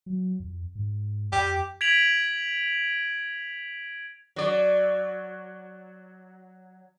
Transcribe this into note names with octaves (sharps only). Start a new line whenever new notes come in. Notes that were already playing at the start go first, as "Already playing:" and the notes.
F#3
F2
G#2
F2 G4
G#6 B6 D7 F7 F#7
F#3 D5